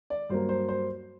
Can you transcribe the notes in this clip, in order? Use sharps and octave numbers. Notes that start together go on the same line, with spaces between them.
D5
G2 F#3 A#3 C5
C5
C5